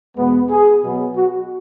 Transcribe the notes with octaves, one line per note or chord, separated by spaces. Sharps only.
E2 B2 G#3 B3
G#4
B2 F#3 B3
F#4